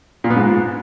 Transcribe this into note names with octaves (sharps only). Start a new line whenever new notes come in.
A#2
B3
G#2